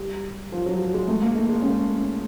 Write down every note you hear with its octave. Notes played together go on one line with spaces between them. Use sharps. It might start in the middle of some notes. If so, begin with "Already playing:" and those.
Already playing: G3
F3
F#3
G#3
A3
A#3
A3
G#3
C#4